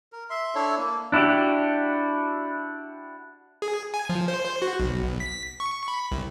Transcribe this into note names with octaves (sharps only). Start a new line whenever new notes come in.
A#4
E5 C6
D4 E4 A4 C#5
A#3
D4 E4 F#4 G4
G#4
G#5
F3
C5
C5
F#4
B1
B6
C#6
B5
C2